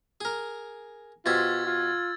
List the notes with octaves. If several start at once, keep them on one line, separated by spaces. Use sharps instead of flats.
G#4 A#4
B2 F4 G4 C5 E6 G#6 A6
F4